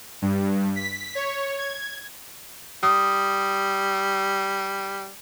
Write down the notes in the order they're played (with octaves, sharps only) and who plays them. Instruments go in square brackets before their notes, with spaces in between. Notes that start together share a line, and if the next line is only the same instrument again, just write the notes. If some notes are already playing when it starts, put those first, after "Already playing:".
[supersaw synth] G2
B6
C#5
G#6
[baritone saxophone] G3 [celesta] D#6